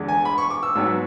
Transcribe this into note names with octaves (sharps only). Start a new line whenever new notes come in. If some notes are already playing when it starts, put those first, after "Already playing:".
Already playing: E2 D3 G#3
G#5
B5
C#6
D6
E6
G#2 F#3 B3 E6